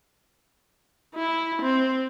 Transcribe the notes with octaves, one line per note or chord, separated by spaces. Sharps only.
E4
C4